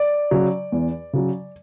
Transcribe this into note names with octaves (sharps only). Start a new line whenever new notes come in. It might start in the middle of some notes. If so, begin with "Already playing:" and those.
Already playing: D5
C#3 F#3
E2
C#3 F#3